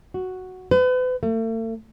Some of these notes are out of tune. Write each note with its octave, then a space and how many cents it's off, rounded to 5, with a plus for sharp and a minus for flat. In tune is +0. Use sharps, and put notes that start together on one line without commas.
F#4 +0
B4 +40
A3 +40